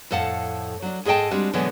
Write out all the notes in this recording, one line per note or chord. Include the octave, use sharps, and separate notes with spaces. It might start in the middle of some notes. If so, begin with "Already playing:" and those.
F2 A2 A4 F5 F#5 A5
F#3 D4
G#2 G#4 A4 D#5 G5 A5
G3 G#3 C4 D4 F#4
B2 D3 E3 F#3 G#3 B3